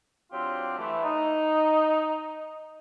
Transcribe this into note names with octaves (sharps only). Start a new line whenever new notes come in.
F#3 C4 D4 F4 G4
E3 A3
D#4